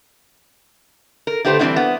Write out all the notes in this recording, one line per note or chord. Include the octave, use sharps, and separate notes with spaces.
A#4
D3 A3 G4 B4 C5
E3 G3 A#3 C4 D4 E4
B3